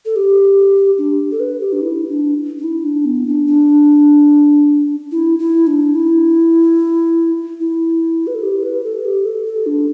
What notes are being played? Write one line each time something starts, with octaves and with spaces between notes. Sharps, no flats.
A4
G4
D4
A4
B4
G4
D4
E4
D4
D4
E4
D4
B3
D4
D4
E4
E4
D4
E4
E4
B4
A4
G4
B4
A4
G4
A4
A4
D4